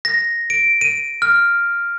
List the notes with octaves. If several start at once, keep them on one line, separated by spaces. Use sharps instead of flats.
A#6
D7
D#7
F6